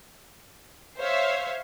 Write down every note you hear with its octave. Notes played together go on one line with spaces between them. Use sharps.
C5 C#5 E5 F5